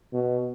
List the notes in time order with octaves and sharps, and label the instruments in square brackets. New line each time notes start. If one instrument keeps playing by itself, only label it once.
[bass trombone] B2